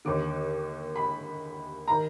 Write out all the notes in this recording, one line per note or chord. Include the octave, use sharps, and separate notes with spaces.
D#2 D3 D6
B5
D#3 A#5